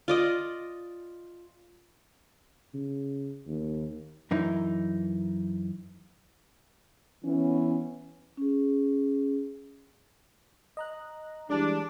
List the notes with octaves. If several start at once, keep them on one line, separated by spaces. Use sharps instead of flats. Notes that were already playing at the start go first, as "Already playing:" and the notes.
F4 D5 D#5
C#3
D#2
F#2 E3 D#4
E3 B3 C#4
C#4 G#4
D#5 A#5 F#6
E3 G3 G#3 D4